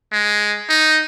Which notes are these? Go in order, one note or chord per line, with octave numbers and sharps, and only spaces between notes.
G#3
D#4